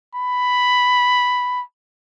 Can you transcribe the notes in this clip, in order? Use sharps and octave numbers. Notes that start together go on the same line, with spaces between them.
B5